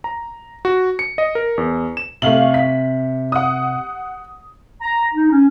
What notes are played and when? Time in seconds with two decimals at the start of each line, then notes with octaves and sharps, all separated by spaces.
0.04 A#5
0.65 F#4
0.99 C#7
1.18 D#5
1.35 A#4
1.58 E2
1.97 E7
2.22 C3 A3 F5 F#7
2.54 B6
3.32 F#5 D#6
4.81 A#5
5.14 D#4
5.32 C#4